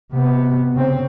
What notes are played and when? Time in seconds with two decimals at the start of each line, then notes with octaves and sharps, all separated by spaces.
0.12 C3 B3
0.74 C#3 C4